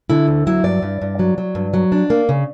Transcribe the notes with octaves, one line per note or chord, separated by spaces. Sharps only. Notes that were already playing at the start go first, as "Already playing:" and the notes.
D3 E4
D2
F#3 E4
G2 D5
G2
G2
F#3
F#3
G2
F#3
D4
A#3
C#3